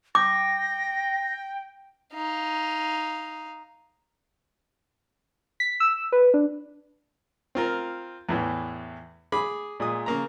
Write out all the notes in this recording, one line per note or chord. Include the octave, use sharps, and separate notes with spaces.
G5 D6 A#6
D#4 F5
B6
E6
B4
D4
C4 F4 A#4
E2 A2 E3
G#4 B5 D6
A#2 G#3 D#6
C#3 A#3 A#5